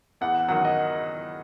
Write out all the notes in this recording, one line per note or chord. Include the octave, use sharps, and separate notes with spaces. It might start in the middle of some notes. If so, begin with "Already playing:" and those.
E2 F#5
D#3 F#3 F#5
D#5